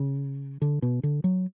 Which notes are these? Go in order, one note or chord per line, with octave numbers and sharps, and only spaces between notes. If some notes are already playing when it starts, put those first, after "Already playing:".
Already playing: C#3
D3
B2
D3
F#3